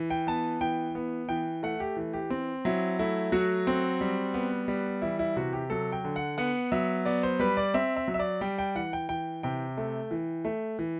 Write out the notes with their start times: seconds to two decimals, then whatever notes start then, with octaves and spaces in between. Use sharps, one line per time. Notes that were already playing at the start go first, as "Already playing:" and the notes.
Already playing: E3
0.10 G5
0.27 B3 A5
0.61 E3 G5
0.95 B3
1.29 E3 G5
1.63 A3 F#5
1.80 G4
1.96 E3
2.13 G4
2.30 C4
2.65 F#3 E4
2.99 A3 E4
3.32 F#3 F#4
3.67 C4
4.01 G3
4.34 B3
4.68 G3
5.02 E3 E4
5.19 E4
5.36 C3 F#4
5.53 G4
5.70 F#3 A4
5.92 G5
6.05 D3
6.16 F#5
6.38 B3 F#5
6.72 F#3 E5
7.05 B3 D5
7.23 C5
7.39 G3 B4
7.57 D5
7.74 C4 E5
7.96 E5
8.08 F#3
8.14 E5
8.19 D5
8.41 G3 G5
8.58 G5
8.75 E3 F#5
8.93 G5
9.09 E3 G5
9.43 C3 G5
9.78 A3
10.11 E3
10.45 A3
10.79 E3